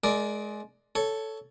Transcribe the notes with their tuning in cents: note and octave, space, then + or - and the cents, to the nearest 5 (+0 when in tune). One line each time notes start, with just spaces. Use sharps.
G#3 +25 A#4 +0 D5 +0
A4 +0 C#5 +15